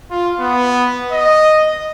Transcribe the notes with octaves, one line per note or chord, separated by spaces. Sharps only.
F4
B3
D#5